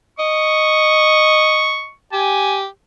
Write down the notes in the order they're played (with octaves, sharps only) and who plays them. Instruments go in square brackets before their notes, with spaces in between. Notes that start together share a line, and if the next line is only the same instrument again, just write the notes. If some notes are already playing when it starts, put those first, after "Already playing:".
[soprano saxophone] D#5 [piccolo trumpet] C#6
[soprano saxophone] G4 [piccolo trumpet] G#5